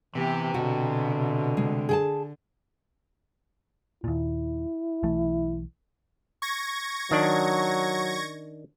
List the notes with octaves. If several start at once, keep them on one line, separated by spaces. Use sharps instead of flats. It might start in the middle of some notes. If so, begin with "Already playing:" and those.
C3 E3 B3 G4
B2 D3 F#4
G#3
G#4 G5 A5
D#2 A#2 E4
B1 E3 A3
C#6 G#6 A#6
D#3 F#3 D4